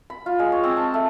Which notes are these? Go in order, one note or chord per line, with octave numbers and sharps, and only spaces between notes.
B5
F4
G#3
C#5
C4
A5
A3